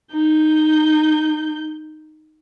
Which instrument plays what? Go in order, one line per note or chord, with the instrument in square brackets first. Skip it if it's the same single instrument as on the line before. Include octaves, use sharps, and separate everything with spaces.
[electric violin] D#4 G6